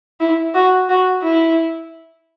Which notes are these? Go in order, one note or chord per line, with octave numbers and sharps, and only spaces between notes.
E4
F#4
F#4
E4